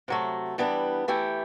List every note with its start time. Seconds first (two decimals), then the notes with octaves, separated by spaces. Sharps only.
0.08 C3 F#3 A3
0.58 E3 G3 B3 D4
1.08 E3 A3 E4 G4